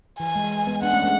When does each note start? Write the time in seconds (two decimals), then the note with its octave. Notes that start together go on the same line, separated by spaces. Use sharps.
0.20 E3 G#5
0.36 G#3
0.67 G#3 B3
0.82 B3 D4 F#5
0.93 A3 C#4
1.03 G#3 B3